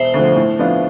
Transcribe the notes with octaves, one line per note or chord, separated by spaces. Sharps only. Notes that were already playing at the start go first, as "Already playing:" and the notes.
Already playing: E1 C5 E5
D2 D3 F3
A2
F3 B3 D4 F4